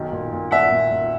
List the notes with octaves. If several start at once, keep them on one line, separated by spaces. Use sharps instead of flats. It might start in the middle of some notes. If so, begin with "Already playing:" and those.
Already playing: B1 D#3
A#2
A#2
A#2 E5 F#5
A#2
A#2